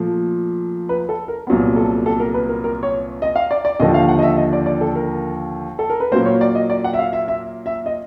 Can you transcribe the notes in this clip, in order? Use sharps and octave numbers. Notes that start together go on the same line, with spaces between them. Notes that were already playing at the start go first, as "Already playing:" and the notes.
Already playing: A#2 F3 A3
B4
A4
A#4
C2 A#2 F#3 B3
A4
A4
A#4
B4
A#4
A#4
C#5
D#5
F5
D5
D5
D#2 D3 F3 D#5
F5
F#5
D#5
E5
D#5
D5
D5
A4
A#4
A4
A#4
B4
A#2 F#3 A#3 C5
C#5
D5
D#5
D5
F#5
E5
F5
E5
E5
E5
D#5